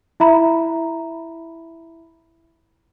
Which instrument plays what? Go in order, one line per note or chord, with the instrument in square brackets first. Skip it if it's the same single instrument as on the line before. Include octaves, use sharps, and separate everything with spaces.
[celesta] E4 E5 A#5 B5